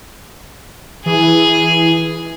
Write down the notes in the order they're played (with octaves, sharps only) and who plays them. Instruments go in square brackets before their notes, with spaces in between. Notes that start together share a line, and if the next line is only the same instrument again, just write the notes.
[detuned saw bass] E3 [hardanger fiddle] G#4